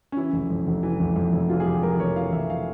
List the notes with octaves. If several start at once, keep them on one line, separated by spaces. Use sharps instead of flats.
C#4
E3 E4
F1
F2
F1
E3
F1
F2
F1
E3 F4
G#4
F1 G4
F2 A#4
F1 C#5
E3 F5
F1 E5
F5